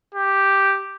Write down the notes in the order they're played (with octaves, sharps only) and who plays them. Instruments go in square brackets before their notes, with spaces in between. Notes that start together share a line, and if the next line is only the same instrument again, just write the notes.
[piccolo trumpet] G4